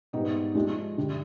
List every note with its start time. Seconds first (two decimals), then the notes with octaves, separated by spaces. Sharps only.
0.13 G#2 G3 B3 D#4
0.55 F3 G#3 D4 G4
0.97 G2 D3 G3